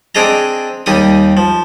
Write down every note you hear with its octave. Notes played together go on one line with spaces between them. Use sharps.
C4 D4 G#4 D#5 A#5
D#2 G3 D#4 D#6
F3